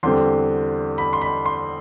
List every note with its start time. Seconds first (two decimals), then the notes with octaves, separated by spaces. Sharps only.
0.03 E2 D3 G3 C4 C6
0.98 B5
1.13 C6
1.22 B5
1.45 C6